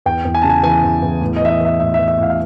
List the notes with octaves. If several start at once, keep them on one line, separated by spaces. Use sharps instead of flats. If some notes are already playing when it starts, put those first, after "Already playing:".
E2 G5
E2
G#5
C#3 A5
G#5
E3 G#5
E2
E2
A2
D#5
E3 E5
D#5
E3 E5
A2 E5
E5
E3
E5
A2 F5
F5